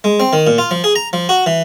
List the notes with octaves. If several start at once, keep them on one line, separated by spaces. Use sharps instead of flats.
G#3
C4
D#3
A#2
F4
F3
G#4
A#5
F3
F#4
E3